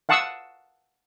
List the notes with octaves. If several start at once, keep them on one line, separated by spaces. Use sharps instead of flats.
F5 F#5 A5 C#6 D#6 E6